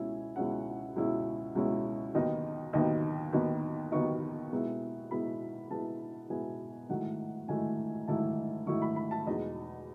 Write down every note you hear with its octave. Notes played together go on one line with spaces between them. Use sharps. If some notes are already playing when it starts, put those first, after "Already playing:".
Already playing: C#2 B2 G#3 C#4 E4 G#5
C#2 B2 G#3 C#4 E4 F#5
C#2 B2 G#3 C#4 E4
C#2 B2 G#3 C#4 E4
D#2 D#3 F#3 B3 D#4 D#5
D#2 D#3 F#3 B3 D#4 D#5
D#2 D#3 F#3 B3 D#4
D#2 D#3 F#3 B3 D#4 C#6
B2 G#3 B3 E4
B2 G#3 B3 E4 B5
B2 G#3 B3 E4 A5
B2 G#3 B3 E4 G#5
G#2 D#3 F#3 A3 E4 F#5
G#2 D#3 F#3 A3 E4 G#5
G#2 D#3 F#3 A3 E4 A5
G#2 D#3 F#3 A3 E4 C#6
B5
B5
A5
E2 B2 G#3 D#4 D#5